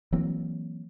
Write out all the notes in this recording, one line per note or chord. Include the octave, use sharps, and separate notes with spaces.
E3 F#3 A#3 C4